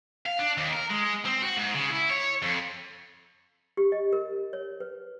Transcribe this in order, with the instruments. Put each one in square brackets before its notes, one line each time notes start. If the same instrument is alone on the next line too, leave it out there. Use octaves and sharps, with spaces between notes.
[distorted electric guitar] F5
D4
D#2
A#4
G#3
C4
F#4
G#2
C#3
E4
C#5
F2
[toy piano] G4
D#5
A#4
C#5
B4